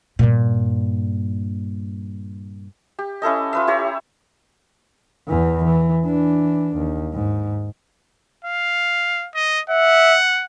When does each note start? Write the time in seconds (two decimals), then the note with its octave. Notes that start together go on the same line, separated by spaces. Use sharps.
0.19 G2 A#2
2.99 G4
3.22 C#4 E4 A4 D#5
3.53 F4 B4 E5
3.67 E4 G4 C#5 A#5
5.28 E2 E3
5.64 E3
6.05 E3 D4
6.77 D#2
7.14 G#2
8.45 F5
9.35 D#5
9.70 E5 F#5